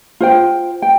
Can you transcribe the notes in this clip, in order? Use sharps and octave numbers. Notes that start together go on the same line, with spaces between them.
F4 C5 G5
G5